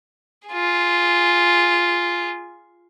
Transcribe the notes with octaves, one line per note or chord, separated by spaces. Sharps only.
F4 G#4